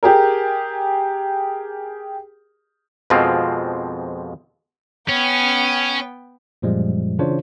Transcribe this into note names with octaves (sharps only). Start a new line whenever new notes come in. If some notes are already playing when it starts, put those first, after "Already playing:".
G4 G#4 A#4
F2 B2 F3 G#3 C4 F4
B3 C#4 G5
F#2 A#2 F3 G3 G#3
C#3 E3 D4 F4 C5 C#5